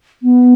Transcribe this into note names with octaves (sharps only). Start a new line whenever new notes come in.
B3